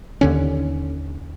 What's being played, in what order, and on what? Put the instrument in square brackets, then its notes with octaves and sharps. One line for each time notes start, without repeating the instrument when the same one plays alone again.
[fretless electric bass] D#2 D3 C#4